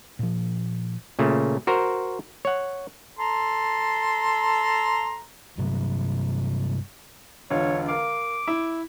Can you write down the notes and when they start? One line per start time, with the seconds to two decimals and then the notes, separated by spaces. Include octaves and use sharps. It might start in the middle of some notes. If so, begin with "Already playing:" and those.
0.19 A#2 F3
1.19 A#2 C#3 A3
1.67 F#4 A#4 C5
2.45 C#5 F#5
3.19 A4 A#5 C6
5.58 G2 C3 F#3
7.51 E1 D3 F4 C#5
7.88 A#4 F5 D6
8.47 E4